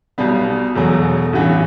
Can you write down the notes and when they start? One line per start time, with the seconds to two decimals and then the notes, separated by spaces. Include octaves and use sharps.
0.18 B1 B2 G3 B3
0.76 E1 E2 B2 F#3 A3
1.33 A1 G2 E3 B3 F#4